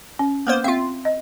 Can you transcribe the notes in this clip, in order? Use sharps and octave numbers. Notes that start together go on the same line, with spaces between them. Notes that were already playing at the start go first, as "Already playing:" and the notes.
C#4
A#3 B3 C5
C4 F4 E5 F5
D#5